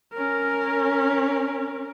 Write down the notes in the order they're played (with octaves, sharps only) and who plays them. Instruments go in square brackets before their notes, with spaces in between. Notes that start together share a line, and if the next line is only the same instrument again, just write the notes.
[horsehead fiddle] C#4 A#4